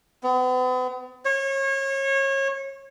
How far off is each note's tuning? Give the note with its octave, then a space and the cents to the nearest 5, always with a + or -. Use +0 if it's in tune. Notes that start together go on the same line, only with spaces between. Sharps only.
B3 +40
C#5 -30